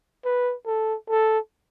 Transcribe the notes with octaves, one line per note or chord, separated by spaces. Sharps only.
B4
A4
A4